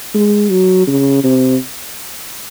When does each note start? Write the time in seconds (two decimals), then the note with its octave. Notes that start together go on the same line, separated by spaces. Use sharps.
0.14 G#3
0.50 F#3
0.87 C#3
1.24 C3